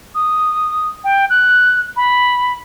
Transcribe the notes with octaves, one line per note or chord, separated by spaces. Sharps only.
D#6
G5
F#6
B5